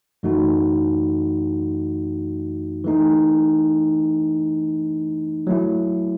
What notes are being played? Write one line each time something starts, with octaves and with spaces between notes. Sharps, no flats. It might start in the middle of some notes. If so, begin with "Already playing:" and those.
F#2 E3 A3 D#4 F#4
E3 A3 D#4
F#3 A3 E4